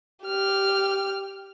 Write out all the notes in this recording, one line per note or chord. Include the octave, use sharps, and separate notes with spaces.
G4 F6